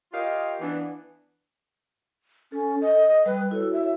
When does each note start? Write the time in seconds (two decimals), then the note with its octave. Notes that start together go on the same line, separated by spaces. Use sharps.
0.12 F4 G4 A#4 C#5 D#5 F5
0.60 E3 B3 D4
2.52 C#4 A4
2.81 D#5
3.26 G3 B4
3.51 E4 F#4 A4 C#5
3.73 E5